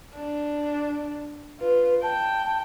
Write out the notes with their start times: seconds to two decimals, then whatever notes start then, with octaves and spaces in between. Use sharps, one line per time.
0.15 D4
1.60 F4 B4
2.02 G5 A5